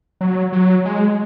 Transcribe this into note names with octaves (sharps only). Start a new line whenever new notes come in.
F#3
F#3
G#3